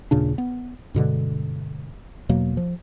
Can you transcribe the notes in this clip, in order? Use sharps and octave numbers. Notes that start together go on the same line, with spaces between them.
D#2 A#2 C#3 D4
B3
G2 B2 D3 G#3
E2 B2 F#3 A#3
F3